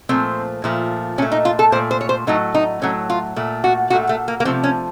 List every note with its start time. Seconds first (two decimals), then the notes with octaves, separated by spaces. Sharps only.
0.09 A#2 F3 A3 C4
0.64 A#2 F3 A3
1.18 A#2 C#4
1.22 A3
1.32 D#4
1.45 F4
1.59 A4
1.72 A#2 C5
1.76 A3
1.91 C5
2.01 C#5
2.09 C5
2.27 A2 F#3 A3 D#4
2.55 D#4
2.82 A2 F#3 A3 C#4
3.10 F4
3.36 A#2 A3
3.64 F#4
3.90 A#2 A3 F#4
4.09 A3
4.28 A#3
4.40 A#3
4.45 C3 F3 A3 C4
4.64 C#4